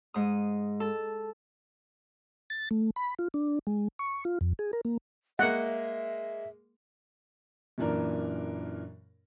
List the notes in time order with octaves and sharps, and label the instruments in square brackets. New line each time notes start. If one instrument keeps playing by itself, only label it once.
[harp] G#2 D#6
A4
[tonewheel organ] A6
A3
B5
F4
D4
G#3
C#6
F4
F2
G#4
A#4
A#3
[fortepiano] G#3 A#3 [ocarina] E5 [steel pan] F#5
[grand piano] F#2 A#2 E3 D4 A#4